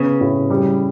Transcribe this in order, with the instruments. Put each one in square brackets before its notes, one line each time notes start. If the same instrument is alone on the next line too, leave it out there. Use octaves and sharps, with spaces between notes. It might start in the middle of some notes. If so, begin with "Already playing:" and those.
Already playing: [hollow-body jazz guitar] C#3 [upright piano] B3
[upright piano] A2
G3